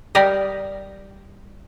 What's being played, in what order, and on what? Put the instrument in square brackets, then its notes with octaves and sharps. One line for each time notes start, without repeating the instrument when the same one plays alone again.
[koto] G3 G4 A#4 D5 D#5